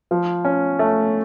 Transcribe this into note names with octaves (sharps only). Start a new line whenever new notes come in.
F3
C#4
A3